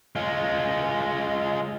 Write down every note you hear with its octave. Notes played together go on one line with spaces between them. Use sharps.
G#3 F4